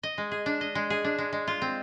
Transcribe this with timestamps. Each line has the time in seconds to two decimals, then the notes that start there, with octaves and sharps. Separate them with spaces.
0.03 D#5
0.18 G#3
0.32 G#4
0.46 D4
0.61 D#5
0.75 G#3
0.90 G#4
1.05 D4
1.18 G#3
1.33 G#3
1.47 F4
1.62 C4